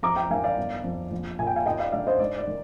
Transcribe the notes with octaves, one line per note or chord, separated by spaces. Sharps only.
F2 A#5 D6
G5 A#5
D#3 F5 G#5
D5 F5
G1
F2
A#1
A#2 G#5
G5
F5 G#5
D#2 D#5 G5
D5 F5
D3 D5 F5
C5 D#5
G#2 D5
D5
D#3